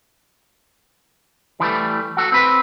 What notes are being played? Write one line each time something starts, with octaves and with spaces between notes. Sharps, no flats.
E3 F3 G3 A3
F#4 A4
C4 B4